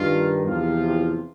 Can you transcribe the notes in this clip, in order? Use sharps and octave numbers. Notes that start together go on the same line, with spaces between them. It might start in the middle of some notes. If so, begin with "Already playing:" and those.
Already playing: G2 D#3 F4
E2 C3 F3 F4